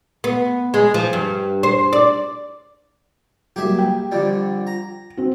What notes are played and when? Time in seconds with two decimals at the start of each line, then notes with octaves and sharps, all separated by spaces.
0.24 B3
0.74 G#3
0.94 F3
1.13 G2
1.63 C5
1.93 D5
3.56 F#3 G3 A#3 G4 G#4 E5
3.79 G5
4.11 F2 D3 G3
4.67 A#5
5.17 C4 F#4